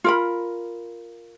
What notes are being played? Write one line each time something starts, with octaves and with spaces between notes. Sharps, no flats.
F4 A#4 B5